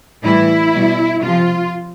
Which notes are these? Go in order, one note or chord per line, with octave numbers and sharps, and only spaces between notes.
A2 E3 G3 E4
B2 G3
C3 F3 F4